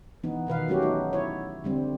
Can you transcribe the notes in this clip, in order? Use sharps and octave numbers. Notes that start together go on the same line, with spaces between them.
E3 B3 D#4
B2 D#3 B4 F5
F#3 A3 C#4 F#4 G4
B3 D#4
E4 C#5
D3 G3 C4